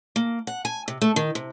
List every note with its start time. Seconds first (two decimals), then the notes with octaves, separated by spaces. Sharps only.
0.16 A#3
0.47 F#5
0.65 G#5
0.88 C3
1.02 A3
1.16 D#3
1.35 C3